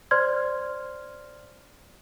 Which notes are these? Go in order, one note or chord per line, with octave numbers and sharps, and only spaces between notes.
C5 D5 C6 F6 G#6